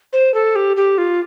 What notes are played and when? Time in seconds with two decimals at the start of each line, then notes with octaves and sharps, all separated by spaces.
0.13 C5
0.34 A4
0.55 G4
0.76 G4
0.98 F4